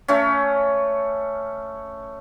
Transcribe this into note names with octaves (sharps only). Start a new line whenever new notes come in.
A3 C#4